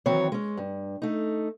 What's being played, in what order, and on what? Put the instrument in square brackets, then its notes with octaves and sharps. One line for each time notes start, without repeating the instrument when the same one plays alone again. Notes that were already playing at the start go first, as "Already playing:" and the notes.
[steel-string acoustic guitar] D#3 E3 F#3 C4 C#5
G#3 C#4
G2
A3 D#4